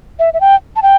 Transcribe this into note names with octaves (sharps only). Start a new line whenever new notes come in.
E5
E5
G5
A5
G5